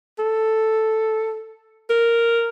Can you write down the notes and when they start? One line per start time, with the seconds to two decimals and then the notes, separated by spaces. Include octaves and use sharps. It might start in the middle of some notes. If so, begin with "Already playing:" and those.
0.19 A4
1.90 A#4